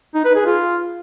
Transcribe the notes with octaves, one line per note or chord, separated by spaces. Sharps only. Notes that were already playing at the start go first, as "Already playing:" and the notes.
D#4
B4
G#4
F4